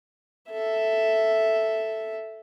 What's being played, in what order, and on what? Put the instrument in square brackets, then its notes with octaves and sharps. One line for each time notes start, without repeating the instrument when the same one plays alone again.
[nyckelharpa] A4 E5